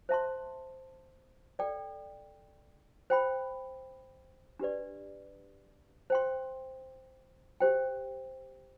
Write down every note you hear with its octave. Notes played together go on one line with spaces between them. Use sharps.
C5 E5 A5 C6
A4 D5 G5
C5 G5 B5
D4 G4 B4 D5
C5 G5 C6
G4 C5 G5